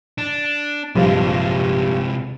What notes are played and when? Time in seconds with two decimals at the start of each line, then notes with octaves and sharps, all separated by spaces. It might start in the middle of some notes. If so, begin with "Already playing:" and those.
0.18 D4
0.95 A#1 G2 C3 F3 G#3